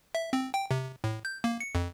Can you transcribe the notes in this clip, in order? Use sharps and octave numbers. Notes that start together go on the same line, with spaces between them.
E5
C4
G5
C3
A2
G6
A#3
C#7
F2